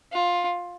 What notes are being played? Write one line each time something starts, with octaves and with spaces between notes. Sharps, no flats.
F4